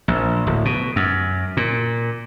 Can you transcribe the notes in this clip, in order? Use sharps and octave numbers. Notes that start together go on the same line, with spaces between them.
A#1
D1
B2
F#2
A#2